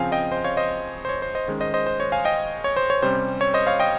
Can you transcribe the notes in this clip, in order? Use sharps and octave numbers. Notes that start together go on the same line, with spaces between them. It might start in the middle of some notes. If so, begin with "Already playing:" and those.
Already playing: C#3 F3 C4 F5 G#5
D#5 G5
C5 D#5
C#5 F5
C5 D#5
C5
C#5
C5
C5 D#5
D#3 G#3 C#4
C5 D#5
C5 D#5
C5
C#5
F5 G#5
D#5 G5
C#5
C5
C#5
C3 G3 C#4 C5
C#5
C5 D#5
C#5 F5
D#5 G5